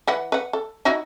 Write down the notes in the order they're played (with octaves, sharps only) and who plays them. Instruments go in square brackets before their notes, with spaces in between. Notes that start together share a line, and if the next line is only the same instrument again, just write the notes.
[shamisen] E3 B4 F#5
B4 F#5
A4
D#4 E4 F#4